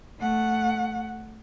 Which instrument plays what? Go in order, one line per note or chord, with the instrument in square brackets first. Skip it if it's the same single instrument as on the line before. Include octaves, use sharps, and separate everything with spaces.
[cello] A3 F#5